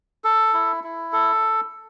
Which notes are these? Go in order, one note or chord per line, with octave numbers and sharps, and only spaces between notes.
A4
E4
E4
A4